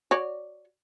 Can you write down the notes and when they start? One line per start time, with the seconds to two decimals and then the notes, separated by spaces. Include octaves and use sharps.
0.11 F#4 C#5 D5